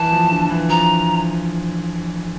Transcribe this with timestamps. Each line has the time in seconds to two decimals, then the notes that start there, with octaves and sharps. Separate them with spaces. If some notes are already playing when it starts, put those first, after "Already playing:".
Already playing: E3 A5
0.12 F3
0.32 D3
0.50 E3
0.70 F3 A#5